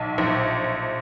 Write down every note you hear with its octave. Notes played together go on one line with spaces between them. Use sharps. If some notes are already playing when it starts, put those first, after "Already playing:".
Already playing: B1
A#1